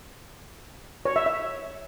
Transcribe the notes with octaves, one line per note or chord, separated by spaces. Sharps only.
C#5
E5
E5